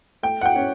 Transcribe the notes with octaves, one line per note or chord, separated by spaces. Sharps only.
A3 G5
F#5
G5
C#4